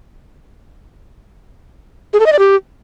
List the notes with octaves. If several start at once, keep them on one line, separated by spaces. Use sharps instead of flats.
G#4
A4
D#5
D5
G4